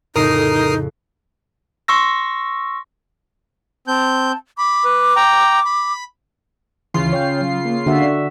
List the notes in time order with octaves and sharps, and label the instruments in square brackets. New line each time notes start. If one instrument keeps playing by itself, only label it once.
[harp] F2 A2 C#3 [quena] D#4 [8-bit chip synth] A#4 D#6 C7
[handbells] C6 C#6 E6 A#6
[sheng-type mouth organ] C4 G6 [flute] A5
[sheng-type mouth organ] B5 [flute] D6
[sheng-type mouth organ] B4
G5 A#5
B5
[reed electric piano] D2 E3 [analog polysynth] C#3 F4 C7
[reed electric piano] C#5 G5 G6
F#3
A#3
[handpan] D3 F#4 E5
[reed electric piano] D5